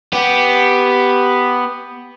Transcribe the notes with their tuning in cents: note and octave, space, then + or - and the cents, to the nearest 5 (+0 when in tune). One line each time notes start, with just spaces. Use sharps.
B3 +0 G4 +0